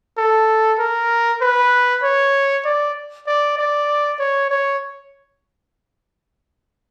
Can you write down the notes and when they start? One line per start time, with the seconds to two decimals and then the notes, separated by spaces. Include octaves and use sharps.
0.18 A4
0.79 A#4
1.42 B4
2.03 C#5
2.65 D5
3.27 D5
3.58 D5
4.19 C#5
4.50 C#5